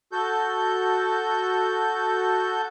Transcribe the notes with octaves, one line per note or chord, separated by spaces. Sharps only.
F#4 A4 G6